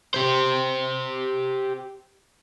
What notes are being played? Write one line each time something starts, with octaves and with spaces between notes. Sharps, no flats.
G4 C5